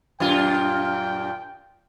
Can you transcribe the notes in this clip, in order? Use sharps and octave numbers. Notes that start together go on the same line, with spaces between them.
F#2 A#2 F4 G5